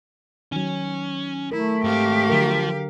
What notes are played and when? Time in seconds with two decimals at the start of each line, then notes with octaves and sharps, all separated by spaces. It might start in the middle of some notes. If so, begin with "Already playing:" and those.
0.52 D#3 F#3 C#4
1.52 A3 E4 A#4
1.84 G#2 C4 G4 F5
2.29 D3 F3 F#3 A#4